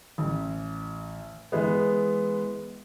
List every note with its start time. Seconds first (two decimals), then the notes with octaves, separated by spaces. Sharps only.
0.18 A1
1.52 E3 G#3 B3